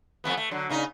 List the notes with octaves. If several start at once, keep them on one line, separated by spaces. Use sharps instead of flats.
F2 A3 B3
A3
D3 F#3
A#2 C#3 D#4